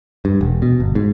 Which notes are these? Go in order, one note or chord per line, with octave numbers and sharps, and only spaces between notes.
G2
E1
B2
G1
G#2